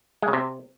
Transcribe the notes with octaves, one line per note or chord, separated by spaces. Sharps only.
G#3
C#3
C3